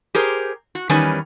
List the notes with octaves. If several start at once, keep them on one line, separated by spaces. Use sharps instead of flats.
G4 G#4 A#4 C5
F#4
E2 D#3 G3 C#4 B4 G#5